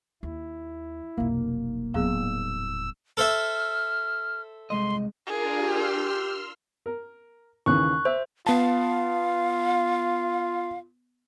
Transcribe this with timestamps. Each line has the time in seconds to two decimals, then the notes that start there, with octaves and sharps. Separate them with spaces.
0.23 D#2 E4
1.17 F1 B1 A#3
1.94 D#1 A2 F#3 B3 G#4 E6
3.17 A4 C5 E5 F6
4.70 C2 G#3 D#5 C6
5.27 D4 F4 G#4 A#4
5.58 G4 C6 E6 F6
6.86 A#4
7.66 D#2 C#3 E3 C#6 F#6
8.05 C5 E5
8.47 B3 F4 F5 A5